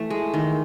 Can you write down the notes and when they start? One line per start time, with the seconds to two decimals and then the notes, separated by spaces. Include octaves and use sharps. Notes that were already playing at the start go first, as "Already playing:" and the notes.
Already playing: E3 A3
0.10 G#3
0.34 D#3